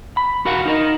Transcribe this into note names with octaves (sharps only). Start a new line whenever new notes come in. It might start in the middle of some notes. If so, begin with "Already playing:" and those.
B5
F#4 A#4 F5 F#5
D#4 A#4 D#5